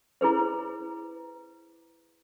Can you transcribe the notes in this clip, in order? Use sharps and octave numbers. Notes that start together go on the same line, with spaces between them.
E4 G#4 B4 C5